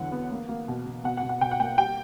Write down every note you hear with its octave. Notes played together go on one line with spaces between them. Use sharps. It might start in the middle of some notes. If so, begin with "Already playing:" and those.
Already playing: E2 D3 E3 F#3 F#5
B3
A#3
A#3
B2
B2
B2 F#5
F#5
B2
F#5
B2 G5
F#5
A#3 G5
G3 G5